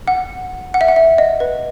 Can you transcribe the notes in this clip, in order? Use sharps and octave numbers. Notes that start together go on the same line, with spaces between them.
F#5
F#5
E5
F#5
E5
D#5
B4